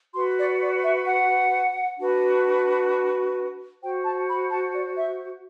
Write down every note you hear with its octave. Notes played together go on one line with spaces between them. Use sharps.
F#4 B4 C6
D5
D5
E5
F#5
D4 F#4 B4
F#4 C5 G5
A5
B5
A5
D5
E5